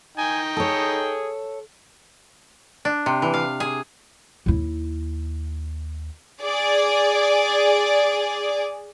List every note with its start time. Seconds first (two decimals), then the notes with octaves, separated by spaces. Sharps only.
0.17 D#4 G5 G#5
0.57 G#4 A4 C#5
2.85 D4
3.06 C3
3.22 E3
3.34 F5
3.60 G#4
4.46 D#2 E4
6.42 G#4 D5